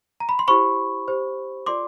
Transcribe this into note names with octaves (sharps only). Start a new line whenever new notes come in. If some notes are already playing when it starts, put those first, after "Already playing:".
A#5
B5
C6
E4 G4 C5 B5 C#6
G4 C5
F4 A4 D5 C6 D6